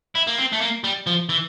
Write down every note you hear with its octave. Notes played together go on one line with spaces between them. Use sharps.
E4
A#3
C4
A3
A#3
G3
F3
E3